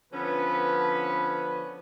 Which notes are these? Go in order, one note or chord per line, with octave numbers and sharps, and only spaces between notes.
D3 F3 B3 C#4 B4